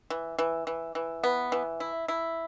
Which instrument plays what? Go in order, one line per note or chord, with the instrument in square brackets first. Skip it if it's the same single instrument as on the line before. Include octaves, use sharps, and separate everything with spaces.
[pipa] E3
E3
E3
E3
B3
E3
E4
E4